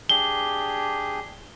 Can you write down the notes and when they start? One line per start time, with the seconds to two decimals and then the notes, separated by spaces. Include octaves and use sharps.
0.09 D4 G4 G#4 G7